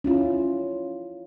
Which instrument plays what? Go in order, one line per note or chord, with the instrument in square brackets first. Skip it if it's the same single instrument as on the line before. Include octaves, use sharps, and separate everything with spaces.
[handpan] C#4 E4 F4